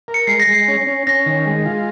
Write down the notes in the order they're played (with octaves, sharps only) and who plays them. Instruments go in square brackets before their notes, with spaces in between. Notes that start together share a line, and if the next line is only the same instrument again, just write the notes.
[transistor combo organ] A#4
[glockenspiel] C#7
[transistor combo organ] G#3 [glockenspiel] C7
[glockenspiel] A#6
[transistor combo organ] G#3 [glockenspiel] C7
[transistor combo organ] C#4
C#4
[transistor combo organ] C#4 [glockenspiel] A#6
[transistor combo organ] D#3
G#3
F4